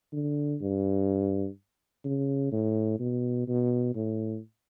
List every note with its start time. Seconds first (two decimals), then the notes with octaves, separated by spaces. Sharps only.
0.13 D3
0.61 G2
2.04 C#3
2.52 A2
3.00 B2
3.48 B2
3.95 A2